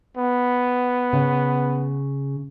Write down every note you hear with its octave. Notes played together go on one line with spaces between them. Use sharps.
B3
C#3